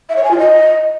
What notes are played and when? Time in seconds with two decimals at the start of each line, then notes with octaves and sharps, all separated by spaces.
0.09 E5
0.16 C#5
0.24 G#5
0.31 F4
0.38 D#5